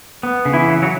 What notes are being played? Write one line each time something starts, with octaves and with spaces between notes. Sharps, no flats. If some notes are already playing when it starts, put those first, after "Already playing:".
B3
C#3
E3 E4
C#3
F#3 F#4